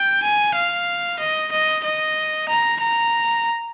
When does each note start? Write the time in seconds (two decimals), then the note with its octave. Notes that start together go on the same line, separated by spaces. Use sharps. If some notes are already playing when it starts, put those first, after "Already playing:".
Already playing: G5
0.23 G#5
0.55 F5
1.20 D#5
1.52 D#5
1.84 D#5
2.49 A#5
2.81 A#5